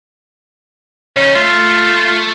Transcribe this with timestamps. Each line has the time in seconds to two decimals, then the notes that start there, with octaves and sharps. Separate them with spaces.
1.16 C#3 C#4 D#4
1.35 A3 F4